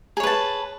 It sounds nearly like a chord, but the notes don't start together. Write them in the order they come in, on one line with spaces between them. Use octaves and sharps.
G#4 C#5 B4 A5